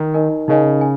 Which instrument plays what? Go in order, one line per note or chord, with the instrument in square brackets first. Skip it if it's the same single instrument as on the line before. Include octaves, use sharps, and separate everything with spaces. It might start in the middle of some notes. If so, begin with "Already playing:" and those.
Already playing: [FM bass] D#3
[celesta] D#4 A#4 D#5 G#5
[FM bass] C#3 [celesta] D#4 A#4 D#5 G#5
[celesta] G#5